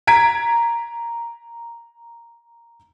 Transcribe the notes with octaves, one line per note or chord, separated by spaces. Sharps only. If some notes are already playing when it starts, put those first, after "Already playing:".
A#5 G#6 B6 D7